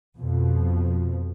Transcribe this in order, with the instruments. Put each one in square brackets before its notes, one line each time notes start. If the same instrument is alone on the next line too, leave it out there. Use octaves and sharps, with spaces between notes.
[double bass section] F2 B2 F3